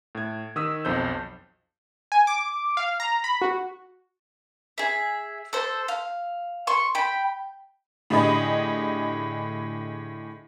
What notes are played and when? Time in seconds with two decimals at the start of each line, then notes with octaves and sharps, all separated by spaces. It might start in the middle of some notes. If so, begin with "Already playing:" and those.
0.15 A2 G#6
0.56 D#3 D#6 E6 B6
0.85 B1 F2 C5 G6
2.12 G#5
2.27 D6
2.77 F5
3.00 A#5
3.24 B5
3.42 F#4
4.78 G#4 E5
5.53 A4 C5
5.88 F5
6.67 C6 C#6
6.95 G5 B5
8.10 A2 D3 G4 G#4 D#5 B5